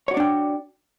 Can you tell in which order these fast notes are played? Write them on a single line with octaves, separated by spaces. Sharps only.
C#5 F#4 D5 D4 G5